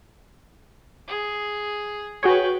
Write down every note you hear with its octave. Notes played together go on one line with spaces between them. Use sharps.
G#4
F#4 G#4 B4 C#5 G5